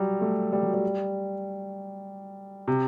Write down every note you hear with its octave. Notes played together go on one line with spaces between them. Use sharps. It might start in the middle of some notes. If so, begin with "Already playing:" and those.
Already playing: F#3 G3
A3
G3
F#3
G3
C3